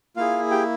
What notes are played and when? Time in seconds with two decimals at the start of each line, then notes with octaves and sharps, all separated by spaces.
0.16 A#3 E4 F4 G#4 F5
0.51 G4 G5